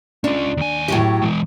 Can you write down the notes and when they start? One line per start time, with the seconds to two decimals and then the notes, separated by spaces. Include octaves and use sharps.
0.24 C#4 D4 F4
0.57 D#2 G#5
0.88 A2 F#3 G4
1.22 E3 G#3